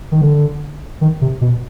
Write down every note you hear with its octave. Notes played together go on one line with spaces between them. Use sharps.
D#3
D3
D#3
C3
B2